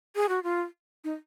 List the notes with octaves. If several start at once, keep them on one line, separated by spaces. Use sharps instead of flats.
G#4
F#4
F4
D#4